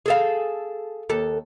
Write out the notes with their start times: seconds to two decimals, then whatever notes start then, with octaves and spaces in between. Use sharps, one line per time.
0.06 G#4 A4 F5
1.09 D#2 A4